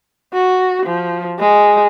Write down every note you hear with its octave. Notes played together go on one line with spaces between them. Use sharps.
F#4
F3
G#3